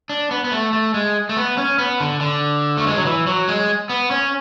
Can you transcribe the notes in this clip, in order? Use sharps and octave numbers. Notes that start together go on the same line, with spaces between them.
D4
B3
B3
A3
A3
G#3
A3
B3
C#4
B3
D3
D3
A3
G#3
F#3
E3
F#3
G#3
B3
C#4